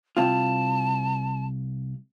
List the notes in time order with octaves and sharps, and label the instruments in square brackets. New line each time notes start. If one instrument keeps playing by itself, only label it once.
[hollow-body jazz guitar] C2 C4 F4 [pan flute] A5